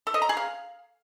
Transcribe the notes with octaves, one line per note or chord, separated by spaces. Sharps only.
A4
D#5
A#5
G#4
F5